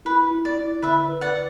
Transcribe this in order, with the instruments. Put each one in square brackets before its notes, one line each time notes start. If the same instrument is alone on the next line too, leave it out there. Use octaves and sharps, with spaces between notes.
[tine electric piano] E4 [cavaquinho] B4
[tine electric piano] E4
[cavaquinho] D5
[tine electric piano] E4
[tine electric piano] D3 [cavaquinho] B4 E5
[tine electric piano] B4
[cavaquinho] D5 F#5